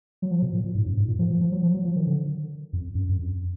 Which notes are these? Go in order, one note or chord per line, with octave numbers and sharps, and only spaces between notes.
F#3
F3
B2
A#2
A#2
G#2
F#2
G#2
A#2
F3
F3
F3
F#3
F3
F#3
F3
D#3
D3
F2
F#2
F#2
F2